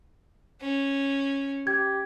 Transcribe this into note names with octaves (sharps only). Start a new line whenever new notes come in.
C#4
G4 G#6